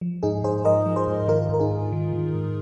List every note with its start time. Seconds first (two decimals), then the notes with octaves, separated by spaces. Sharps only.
0.01 F3
0.23 G#2 D#4 G#4
0.43 G#2 G#4 C5
0.65 F3 A#4 D#5
0.86 F3
0.96 G#4 C5
1.07 G#2
1.28 D#3 F4 A#4
1.49 G#2 A#4
1.59 D#4 G#4
1.71 G#2
1.92 D#3
2.13 D#3
2.34 G#2